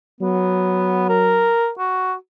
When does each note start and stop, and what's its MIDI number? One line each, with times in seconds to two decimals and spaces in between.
0.21 1.54 54
0.21 1.07 59
1.09 1.70 70
1.79 2.14 66